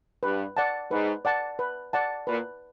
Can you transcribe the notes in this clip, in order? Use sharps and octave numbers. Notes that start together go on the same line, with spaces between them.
G2 B4
D5 F#5 A5
G#2 B4
D5 F#5 A5
B4
D5 F#5 A5
A#2 B4